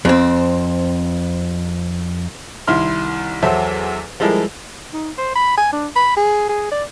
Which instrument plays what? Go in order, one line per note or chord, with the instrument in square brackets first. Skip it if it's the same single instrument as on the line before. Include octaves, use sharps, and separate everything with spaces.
[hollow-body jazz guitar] F2 C4
[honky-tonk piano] C2 D#3 E4 C6 F6
E2 F#3 A4 C5 E5
F3 G3 G#3 E4 A4 A#4
[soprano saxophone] D#4
C5
B5
G#5
D4
B5
G#4
G#4
D5